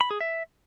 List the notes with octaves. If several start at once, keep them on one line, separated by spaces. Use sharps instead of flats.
B5
G#4
E5